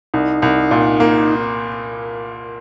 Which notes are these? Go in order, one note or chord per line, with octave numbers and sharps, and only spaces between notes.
C2 D#4
C2
A#2
A#3